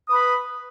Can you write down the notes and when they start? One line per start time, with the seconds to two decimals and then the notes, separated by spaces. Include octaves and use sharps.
0.08 D#6
0.11 B4
0.15 B5